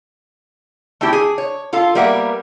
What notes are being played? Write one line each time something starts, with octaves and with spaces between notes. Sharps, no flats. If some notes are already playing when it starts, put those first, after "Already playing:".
A3 C4 E4 G4
G#4
C#5
F4 A4 F5
G3 A#3 B3 A#4 E5 F#5